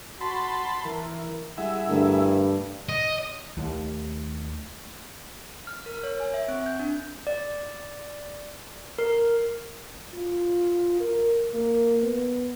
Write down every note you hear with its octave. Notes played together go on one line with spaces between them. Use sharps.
F#4 A5 B5 C6
E3 A#4
G3 E4 G#4 E5 F#5
G2 D3 A3 A#4
D#5
D#2 A3
F6
A#4
C#5
G#5
E5
C4
G6
D4
D5
A#4
F4
A#4
A#3
B3